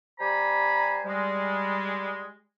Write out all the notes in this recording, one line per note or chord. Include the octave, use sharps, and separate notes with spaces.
G3 G4 C5 G#5 A#5 B5
G3 G#3